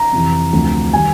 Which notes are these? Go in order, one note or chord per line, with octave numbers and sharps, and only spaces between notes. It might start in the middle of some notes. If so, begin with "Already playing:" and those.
Already playing: A#5
F2 C3 E3
D2 C3 F3
D#3 G3 G#5